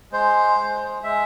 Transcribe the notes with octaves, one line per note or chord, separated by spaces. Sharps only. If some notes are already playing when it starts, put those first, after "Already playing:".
G#3 C5
G#3
G#3 E5